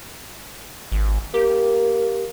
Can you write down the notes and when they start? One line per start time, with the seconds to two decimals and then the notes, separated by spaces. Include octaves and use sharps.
0.92 G#1
1.34 A#3 G4